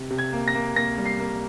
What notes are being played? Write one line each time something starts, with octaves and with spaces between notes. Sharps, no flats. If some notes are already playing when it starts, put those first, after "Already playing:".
Already playing: C3
C3
G#6
A#3
A#6
A#3
A#3 A#6
G3
C7
A#3